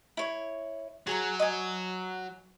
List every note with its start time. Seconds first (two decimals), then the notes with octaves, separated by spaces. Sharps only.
0.17 E4 C#5
1.07 F#3 G#4 G#5 A#5
1.39 D#5 G#5